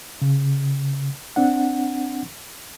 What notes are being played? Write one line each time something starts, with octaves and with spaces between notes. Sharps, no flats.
C#3
C4 D4 F#5